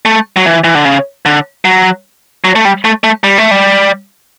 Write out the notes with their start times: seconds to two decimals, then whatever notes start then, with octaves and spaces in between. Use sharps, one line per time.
0.05 A3
0.37 F#3
0.45 E3
0.64 E3
0.75 D3
0.85 C#3
1.26 D3
1.65 F#3
2.45 F#3
2.56 A3
2.65 G3
2.85 A3
3.04 A3
3.24 G3
3.38 A3
3.51 G3